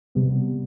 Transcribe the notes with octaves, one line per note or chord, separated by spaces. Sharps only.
C3 G3 B3